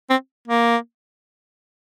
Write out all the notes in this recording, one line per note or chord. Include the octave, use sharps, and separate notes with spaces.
C4
A#3